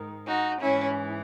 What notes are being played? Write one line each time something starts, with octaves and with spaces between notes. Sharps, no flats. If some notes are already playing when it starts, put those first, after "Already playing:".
Already playing: G#2 D#3
D#4 F#4
G#2 E3 C#4 E4